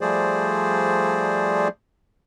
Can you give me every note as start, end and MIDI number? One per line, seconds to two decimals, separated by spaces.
0.01 1.68 53
0.01 1.68 55
0.01 1.68 57
0.01 1.68 68
0.01 1.68 72
0.01 1.68 74